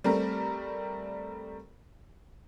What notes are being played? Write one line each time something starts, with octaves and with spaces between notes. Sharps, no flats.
G3 A3 C4 A#4